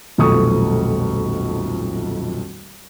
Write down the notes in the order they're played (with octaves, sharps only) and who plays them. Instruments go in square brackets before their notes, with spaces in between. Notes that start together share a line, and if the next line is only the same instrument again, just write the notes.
[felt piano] D#1 B1 F2 A3 C#6 D#6